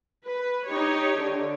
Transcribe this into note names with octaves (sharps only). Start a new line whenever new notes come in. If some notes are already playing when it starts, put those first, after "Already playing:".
B4
D#4 G4 C#5
D3